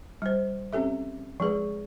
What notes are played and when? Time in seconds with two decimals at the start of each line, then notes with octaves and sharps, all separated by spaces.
0.22 G3 C5
0.73 C4 C#4 G4 A4 E5
1.40 F3 G#3 G#4 B4